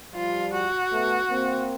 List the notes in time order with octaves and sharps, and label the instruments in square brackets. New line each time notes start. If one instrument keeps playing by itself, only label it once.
[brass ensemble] F3 G3 [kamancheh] F4
[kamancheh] F#4
[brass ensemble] A3 B3
A#3 C4